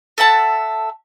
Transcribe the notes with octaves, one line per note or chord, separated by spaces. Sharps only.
A4 E5 F#5 A5